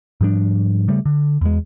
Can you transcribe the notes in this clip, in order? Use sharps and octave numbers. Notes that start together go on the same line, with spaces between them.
G#2 F3 G3 D4
C#3 G3 A3
D3
E2 G#3